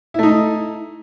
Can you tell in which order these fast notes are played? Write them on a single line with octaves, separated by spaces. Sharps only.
E4 A3 D#4